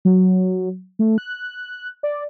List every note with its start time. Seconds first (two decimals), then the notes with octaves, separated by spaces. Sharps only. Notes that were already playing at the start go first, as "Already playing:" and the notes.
0.05 F#3
0.99 A3
1.18 F#6
2.03 D5